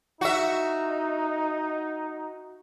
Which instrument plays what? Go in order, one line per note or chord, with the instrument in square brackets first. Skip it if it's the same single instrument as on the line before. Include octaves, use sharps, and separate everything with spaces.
[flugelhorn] D#4 [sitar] F#4 E5